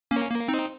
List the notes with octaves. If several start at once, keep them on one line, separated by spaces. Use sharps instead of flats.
A#3 C#4
A#3
C4 D#4